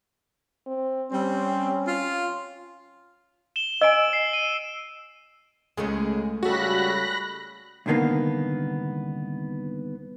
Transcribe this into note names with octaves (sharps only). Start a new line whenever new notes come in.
C4
G3 C4 C#4
F4
E7 G7
D#5 G#5 E6 D7
C7
D#7
C#2 G#3 A3 C#4 G#4
C#2 C#3 G3 F#4 A4 B5 F#6 A#6
C2 G#2 D3 D#3 A#3 B3